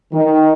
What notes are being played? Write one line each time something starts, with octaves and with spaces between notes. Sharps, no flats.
D#3